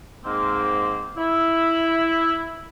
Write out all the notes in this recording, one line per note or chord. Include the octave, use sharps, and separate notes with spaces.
G#2 A#3 C4
E4